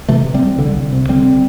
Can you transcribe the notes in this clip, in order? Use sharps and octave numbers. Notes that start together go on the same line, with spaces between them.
C3 E3 A3
C3
G3 C4
C2
C2 D3 G3
C2
C3
D3 G3 C4